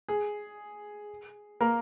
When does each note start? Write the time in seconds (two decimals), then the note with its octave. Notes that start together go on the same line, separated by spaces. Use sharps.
0.09 G#4
1.60 A#3 A#4